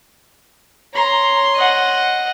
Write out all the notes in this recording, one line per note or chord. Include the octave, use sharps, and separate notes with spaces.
C#5 A#5 C6
D#5 F#5